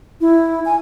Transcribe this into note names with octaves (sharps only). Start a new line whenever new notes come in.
E4
G#5